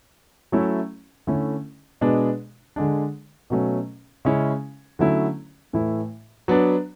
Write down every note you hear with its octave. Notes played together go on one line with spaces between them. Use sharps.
F#3 A3 C#4 E4
D3 A3 C#4 E4
B2 G#3 B3 D4
D3 G#3 D4
B2 F#3 A3 C#4
C#3 G#3 C#4 E4
D3 F#3 A3 C#4 E4
A2 E3 A3 E4
F#3 B3 D4